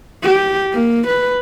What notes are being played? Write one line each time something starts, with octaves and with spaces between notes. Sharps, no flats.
G4
A#3
B4